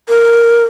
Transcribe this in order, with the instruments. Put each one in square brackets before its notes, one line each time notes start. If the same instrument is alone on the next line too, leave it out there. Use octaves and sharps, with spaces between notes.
[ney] A#4